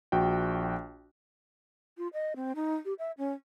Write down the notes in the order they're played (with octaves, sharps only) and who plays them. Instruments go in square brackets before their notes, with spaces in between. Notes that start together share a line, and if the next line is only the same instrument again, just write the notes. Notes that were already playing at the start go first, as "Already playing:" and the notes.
[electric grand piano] A#1 F#4 G5
[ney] F4
D#5
C4
D#4
G4
E5
C#4